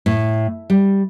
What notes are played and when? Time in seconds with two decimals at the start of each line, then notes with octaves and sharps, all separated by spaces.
0.06 A2
0.70 G3